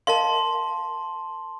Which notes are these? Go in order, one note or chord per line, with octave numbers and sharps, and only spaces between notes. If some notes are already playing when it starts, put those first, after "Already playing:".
A#4 D#5 F5 A5 C6